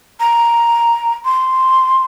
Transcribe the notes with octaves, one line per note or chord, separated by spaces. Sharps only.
A#5
C6